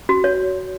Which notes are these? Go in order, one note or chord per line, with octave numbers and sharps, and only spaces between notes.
F#4
C#5